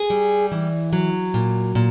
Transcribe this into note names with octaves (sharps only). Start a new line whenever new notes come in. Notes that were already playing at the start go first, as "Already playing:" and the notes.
Already playing: G#4
G3
E3
F#3
A#2
A#2